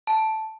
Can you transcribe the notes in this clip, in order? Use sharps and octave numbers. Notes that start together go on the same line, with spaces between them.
A5